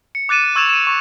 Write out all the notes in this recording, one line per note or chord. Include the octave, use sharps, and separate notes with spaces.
C#7
D6 F#6 A6 D#7 E7
D6
C#6 E6 G#6 A6 E7 F7
D#7 E7
C#6